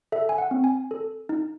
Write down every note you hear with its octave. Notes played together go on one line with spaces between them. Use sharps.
A4 E5
G#5
F#5
C4
G#5
A4
D#4